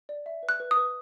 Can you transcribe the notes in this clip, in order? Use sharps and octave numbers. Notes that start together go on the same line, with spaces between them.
D5
E5
B4
F#6
B4
D#6
B4